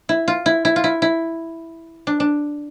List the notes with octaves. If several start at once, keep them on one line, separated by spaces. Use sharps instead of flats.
E4
F4
E4
E4
F4
E4
E4
D4
D4